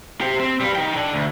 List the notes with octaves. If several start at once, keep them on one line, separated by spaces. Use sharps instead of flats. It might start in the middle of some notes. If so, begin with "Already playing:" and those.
G4 C5
C4
G3 B4
D#4 G5
D3
D2